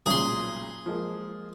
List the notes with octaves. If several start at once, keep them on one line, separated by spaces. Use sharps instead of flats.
B1 A#2 C#4 G#4 C6
F3 G#3 A#3